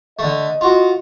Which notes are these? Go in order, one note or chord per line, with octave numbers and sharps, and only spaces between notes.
D3 A3 D#5
F4 F#4